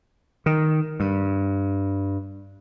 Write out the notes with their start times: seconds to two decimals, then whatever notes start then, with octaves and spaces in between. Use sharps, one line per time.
0.46 D#3
1.00 G2